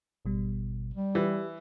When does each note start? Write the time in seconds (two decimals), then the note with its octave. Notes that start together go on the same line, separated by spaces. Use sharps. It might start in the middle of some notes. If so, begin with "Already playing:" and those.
0.25 G#1 B2 G3
0.93 G3
1.15 E3 G4